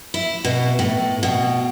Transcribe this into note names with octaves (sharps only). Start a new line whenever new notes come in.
E4
B2
A2
B2